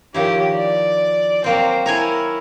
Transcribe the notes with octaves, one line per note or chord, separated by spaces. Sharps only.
D#3 F3 E4 G4 C#5
D5
F#3 A#3 C4 C5 G5
E4 A#4 C#5 G#5